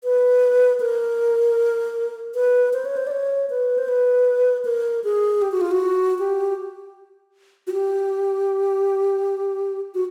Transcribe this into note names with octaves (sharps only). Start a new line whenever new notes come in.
B4
A#4
B4
C5
C#5
C5
D5
C#5
B4
C5
B4
A#4
G#4
G4
F#4
F4
F#4
G4
F#4
G4
F#4